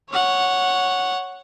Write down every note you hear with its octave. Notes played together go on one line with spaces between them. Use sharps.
C#5 F#5